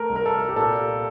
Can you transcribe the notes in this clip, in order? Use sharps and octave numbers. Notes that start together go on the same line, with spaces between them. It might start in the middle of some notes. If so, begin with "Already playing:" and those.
Already playing: A3 A#4
C2
A#4
A4
G4
A#2 A4